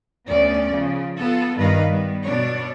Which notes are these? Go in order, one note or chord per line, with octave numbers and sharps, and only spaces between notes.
D2 B3 C#4 D5
C#3 F3
B3 F4 A4
G2 D#3 D#4 B4 D#5 F5
G3 B3
B2 D4 C#5